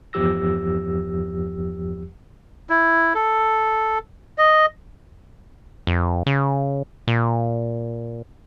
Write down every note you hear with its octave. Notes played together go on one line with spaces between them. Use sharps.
E2 G2 F3 G4 E6 A#6
E4
A4
D#5
F2
C#3
A#2